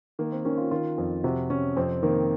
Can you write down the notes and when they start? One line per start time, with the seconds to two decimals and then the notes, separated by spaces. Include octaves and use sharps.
0.19 D#3 A#3
0.32 C4
0.45 D#3 C#4
0.58 F4
0.71 D#3 F4
0.98 F2
1.24 C3 F#4
1.50 C3 C#4
1.76 F2 C4
2.03 D#3 A#3